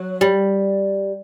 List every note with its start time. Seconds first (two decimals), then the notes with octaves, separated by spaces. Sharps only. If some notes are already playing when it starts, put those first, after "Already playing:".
Already playing: F#3
0.21 G3